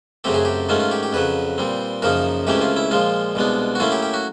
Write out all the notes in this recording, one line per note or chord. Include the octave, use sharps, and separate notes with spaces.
F#2 C#3 F#3 A3 C4 G4
G#4
G4
G#2 D#3 F#3 A3 C#4 F4
F4
G4
G4
F2 C#3 F#3 B4
A#2 G3 C4
F#2 C#3 F3 A#3 D#4 A#4
C#2 C3 E3 A3 C#4 G4
F4
E4
A#2 F3 G#3 F4
C2 B2 G#3 B3 D4
F#4
A2 F#3 A#3 C#4 E4 F4
G4
G4
F#4